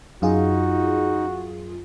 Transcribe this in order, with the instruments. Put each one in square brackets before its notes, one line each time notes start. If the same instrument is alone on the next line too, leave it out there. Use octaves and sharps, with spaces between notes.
[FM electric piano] F#2 F4 G#4 [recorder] D#4 [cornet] F#4